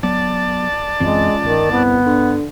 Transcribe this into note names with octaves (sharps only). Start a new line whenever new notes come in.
F#3 B3 D5 A5
C#2 F#2 E3 G#3 C4
G1 D#3
C2 B3
D3